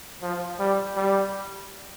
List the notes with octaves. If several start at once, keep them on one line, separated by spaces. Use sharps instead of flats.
F3
G3
G3